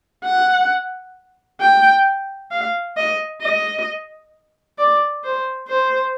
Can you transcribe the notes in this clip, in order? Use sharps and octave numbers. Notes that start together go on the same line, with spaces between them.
F#5
G5
F5
D#5
D#5
D5
C5
C5